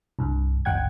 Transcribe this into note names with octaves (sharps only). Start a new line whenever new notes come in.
C2 G2
G1 C#2 F#5 G5 G#6